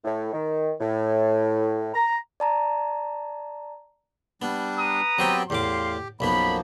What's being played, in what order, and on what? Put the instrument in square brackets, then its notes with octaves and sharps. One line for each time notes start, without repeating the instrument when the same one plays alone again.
[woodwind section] A2
D#3
A2
A#5
[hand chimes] D5 A5 A#5
[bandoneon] G3 D4 [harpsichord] B3
[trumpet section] B4 A#5 D#6
[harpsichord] F#3 C5 G5 [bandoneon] B3 C4 G4
[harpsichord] E2 A2 D6 [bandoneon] G4 [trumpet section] F5 C6
[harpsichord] B1 F#2 B3 [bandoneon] F3 A#3 [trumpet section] B5